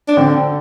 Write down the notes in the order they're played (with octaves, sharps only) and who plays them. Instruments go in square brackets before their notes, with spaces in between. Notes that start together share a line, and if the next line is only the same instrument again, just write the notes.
[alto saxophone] D4
[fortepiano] D3 [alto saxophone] C4